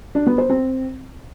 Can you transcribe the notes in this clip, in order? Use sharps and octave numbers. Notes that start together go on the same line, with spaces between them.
D4
B3
C5
C4